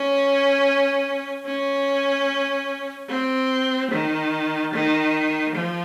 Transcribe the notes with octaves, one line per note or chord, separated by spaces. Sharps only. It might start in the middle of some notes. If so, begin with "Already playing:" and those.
Already playing: C#4
C#4
C4
D#3
D#3
F3